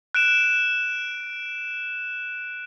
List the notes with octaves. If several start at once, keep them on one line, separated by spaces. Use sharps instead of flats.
F#6 D7 E7